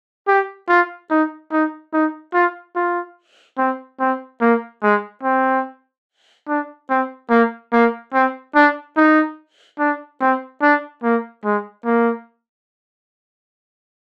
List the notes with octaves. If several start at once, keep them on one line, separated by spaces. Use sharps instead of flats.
G4
F4
D#4
D#4
D#4
F4
F4
C4
C4
A#3
G#3
C4
D4
C4
A#3
A#3
C4
D4
D#4
D4
C4
D4
A#3
G#3
A#3